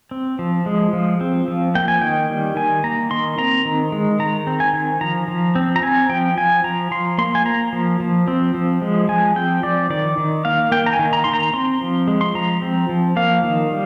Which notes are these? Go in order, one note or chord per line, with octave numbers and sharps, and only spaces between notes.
C4
F3
G#3
F3
C4
F3
A#3 G5
G#5
D#3 G5
G3
D#3 G#5
A#3 A#5
D#3 C6
C4 A#5
D#3
G#3
D#3 A#5
C4
G#5
D#3
F3 A#5
F3
C4
A#5
C4 G#5
F3 G5
F3 G#5
F3 A#5
F3 C6
A#3 C6
G#5
A#3 A#5
F3
F3
C4
F3
G#3
F3 G#5
C4 G5
F3 D5
D#3 D5
D#3
A#3 F5
A#3 G5
A#5
G#5
D#3
A#5
D#3 C6
A#5
C4 C6
F3
G#3
C6
F3 A#5
C4
F3
A#3 F5
D#3
G3